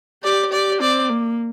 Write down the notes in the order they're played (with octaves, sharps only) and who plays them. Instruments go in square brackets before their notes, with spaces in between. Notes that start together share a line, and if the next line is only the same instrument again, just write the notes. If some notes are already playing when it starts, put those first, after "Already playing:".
[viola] G4 [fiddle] D5
[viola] G4 [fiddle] D5
[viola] C4 [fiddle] D5
[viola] A#3